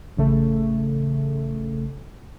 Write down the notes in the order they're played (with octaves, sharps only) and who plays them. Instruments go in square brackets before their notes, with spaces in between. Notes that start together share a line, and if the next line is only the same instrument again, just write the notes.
[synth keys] A1 C#3 A3